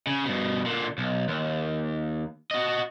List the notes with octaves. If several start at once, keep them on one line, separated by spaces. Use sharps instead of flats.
C#3
G2 B2
A#2 D3
B1
D#2
F#4 D#5